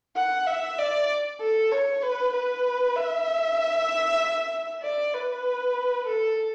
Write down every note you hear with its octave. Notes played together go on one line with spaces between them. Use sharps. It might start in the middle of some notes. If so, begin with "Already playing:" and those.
F#5
E5
D5
A4
C#5
B4
B4
E5
D5
B4
A4